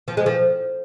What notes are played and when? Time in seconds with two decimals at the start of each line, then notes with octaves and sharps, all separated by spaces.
0.08 F3
0.17 G#3
0.26 F3